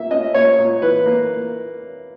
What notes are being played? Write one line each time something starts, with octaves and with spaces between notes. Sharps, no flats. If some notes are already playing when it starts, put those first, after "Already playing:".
Already playing: A#2 A#3 E5
C#4 D#5
A#2 C#5
A#2
E3 B4
A#3